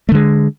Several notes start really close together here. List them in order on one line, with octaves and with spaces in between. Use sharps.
A3 D3 G#3